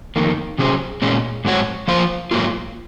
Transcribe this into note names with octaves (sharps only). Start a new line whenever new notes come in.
F2 D#3 A#3
C3 F#3 C#4 G#4 C5
A#2 G#3 C#4
G#2 F#3 C4 F#4 C#5
F3 A#3 F4 C5 F5
G#2 F#3 A#3 F4